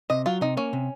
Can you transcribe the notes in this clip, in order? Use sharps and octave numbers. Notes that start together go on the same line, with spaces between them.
C3 D#5
F#3 F4
C3 D#4
A#3 C#4
C3